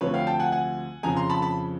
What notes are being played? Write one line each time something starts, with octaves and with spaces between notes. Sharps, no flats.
D2 C3 F3 B4 C#5
F5 G5
G5 A5
F#5 G#5
F#5 G#5
F2 C#3 F3 G#5 A#5
A#5 C6
A5 B5
A5 B5